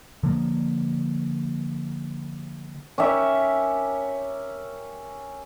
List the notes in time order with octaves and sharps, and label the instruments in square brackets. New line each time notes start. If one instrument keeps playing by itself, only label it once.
[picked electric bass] D3 F3 A#3
[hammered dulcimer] C#4 G4 A#4 E5